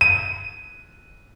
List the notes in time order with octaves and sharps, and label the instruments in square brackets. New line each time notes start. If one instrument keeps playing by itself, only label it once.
[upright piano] D#7